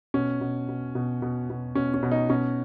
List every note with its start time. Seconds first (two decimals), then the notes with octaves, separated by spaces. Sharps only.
0.14 B2 C#4
0.41 B2
0.69 B2
0.95 B2
1.22 B2
1.50 B2
1.75 B2 C#4
1.94 C#4
2.03 B2
2.11 D#4
2.29 B2 C#4